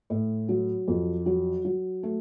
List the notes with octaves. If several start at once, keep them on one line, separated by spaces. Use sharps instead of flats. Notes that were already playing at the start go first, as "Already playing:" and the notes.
A2
F#3
F2
F#3
F#3
A3